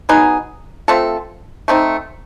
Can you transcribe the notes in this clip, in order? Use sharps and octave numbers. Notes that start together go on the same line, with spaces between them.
F#3 B3 D#4 G#4
A3 C4 F4 A4
A3 C4 D#4